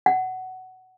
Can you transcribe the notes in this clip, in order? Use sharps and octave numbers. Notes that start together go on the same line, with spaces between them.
F#5